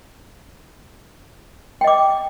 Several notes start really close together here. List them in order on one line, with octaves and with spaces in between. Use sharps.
G5 D#5 D6